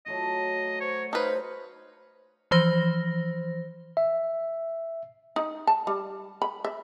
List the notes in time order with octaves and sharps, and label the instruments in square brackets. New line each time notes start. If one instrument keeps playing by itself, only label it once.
[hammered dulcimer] F#3 A3 F#4 [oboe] D#5
[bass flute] C5 [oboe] C#5
[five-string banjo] D#4 B4 [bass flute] C5 [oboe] F5
[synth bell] E3 F3 C5 A#6
[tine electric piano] E5
[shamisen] D#4
A5
G3
B5
E5